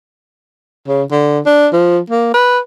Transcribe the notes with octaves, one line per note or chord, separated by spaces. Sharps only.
C#3
D3
D4
F3
A#3
B4